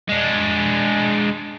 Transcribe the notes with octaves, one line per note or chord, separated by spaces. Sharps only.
G#3 D4